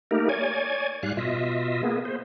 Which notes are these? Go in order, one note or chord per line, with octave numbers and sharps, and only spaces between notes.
A3 A#3 D#4 G4 A#4
C#5 D5 G#5
G#2 G3 F5 F#6
B2 F4 D#5 E5
A#3 B3 G#4
C5